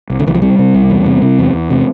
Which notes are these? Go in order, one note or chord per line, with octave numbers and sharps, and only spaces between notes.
C2
D3
C2 E3
F3
C3 G3
C3
C2
E2
C3
C3
E2
E2
C3